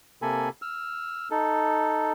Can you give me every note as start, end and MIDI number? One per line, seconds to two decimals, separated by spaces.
0.22 0.49 48
0.22 0.49 58
0.22 0.49 69
0.22 0.49 80
0.22 0.49 83
0.62 1.29 88
0.62 1.29 89
1.31 2.13 63
1.31 2.13 69